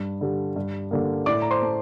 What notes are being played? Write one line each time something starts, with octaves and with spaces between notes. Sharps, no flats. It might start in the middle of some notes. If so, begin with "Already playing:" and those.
Already playing: G2
D3 G3
G2
D3 G3 A#3
A2 D5 D6
A#5
C5 C6
A3